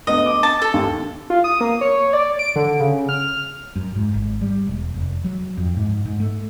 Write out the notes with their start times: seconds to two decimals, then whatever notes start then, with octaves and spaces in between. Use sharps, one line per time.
0.07 D2 B3 D#5
0.26 D6
0.43 A5
0.62 A4
0.74 D#2
1.30 F4
1.44 D#6
1.61 A#3
1.81 C#5
2.13 D5
2.39 D7
2.56 D3
2.80 C#3
3.09 F6
3.76 F#2
3.96 G#2
4.14 G#1
4.41 G3
4.67 E1
4.94 F1
5.24 F#3
5.57 F2
5.77 G#2
6.06 G#2
6.20 A3